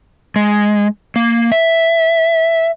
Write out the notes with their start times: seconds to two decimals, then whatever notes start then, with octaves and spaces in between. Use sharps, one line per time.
0.36 G#3
1.16 A#3
1.52 E5